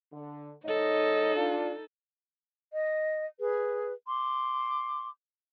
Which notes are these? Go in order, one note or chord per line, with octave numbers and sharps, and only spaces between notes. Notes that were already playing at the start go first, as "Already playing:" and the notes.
D3
G#2 D#4 A4 C#5 D#5
D4 F4
D#5
G#4 B4
C6 D6